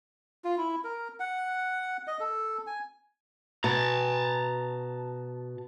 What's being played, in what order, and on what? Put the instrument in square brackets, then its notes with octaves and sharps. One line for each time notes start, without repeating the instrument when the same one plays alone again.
[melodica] F4
E4
A#4
F#5
D#5
A4
G#5
[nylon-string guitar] B2 [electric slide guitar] A5 A#5